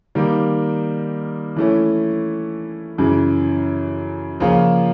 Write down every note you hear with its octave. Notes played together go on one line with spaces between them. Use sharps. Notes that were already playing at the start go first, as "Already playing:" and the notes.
D#3 G3 A#3
E3 A3 C#4 E4
F#2 C#3 E3
C#3 F3 A#3 C#4 F4